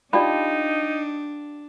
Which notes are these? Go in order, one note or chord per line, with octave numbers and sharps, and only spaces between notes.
D4 D#4 F4 G4 D5 A5 B5